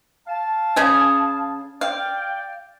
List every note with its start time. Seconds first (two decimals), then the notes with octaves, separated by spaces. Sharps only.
0.26 F5 A5
0.76 C#3 G#4
1.81 D5 F5 G5